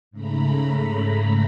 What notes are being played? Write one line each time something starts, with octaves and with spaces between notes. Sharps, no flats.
G#2 C#3 A3 A#5 B5